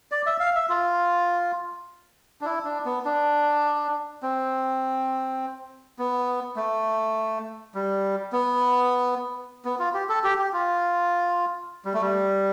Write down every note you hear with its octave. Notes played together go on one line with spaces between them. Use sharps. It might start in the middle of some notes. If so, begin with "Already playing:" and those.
D5
E5
F5
E5
F4
D4
E4
D4
B3
D4
C4
B3
A3
G3
B3
B3
F4
G4
A4
G4
G4
F4
G3
A3
G3